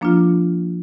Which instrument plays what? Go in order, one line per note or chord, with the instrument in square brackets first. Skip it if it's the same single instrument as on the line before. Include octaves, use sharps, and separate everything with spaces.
[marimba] F3 A#3 D4 F4